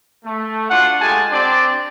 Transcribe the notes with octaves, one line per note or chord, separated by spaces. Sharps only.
A3
D4 F4 F#4 F#5
G#3 A3 F4 G4 G#5 A5
C4 D4 G4 D5